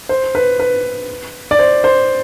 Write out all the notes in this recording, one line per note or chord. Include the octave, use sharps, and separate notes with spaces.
C5
B4
B4
D5
C5
C5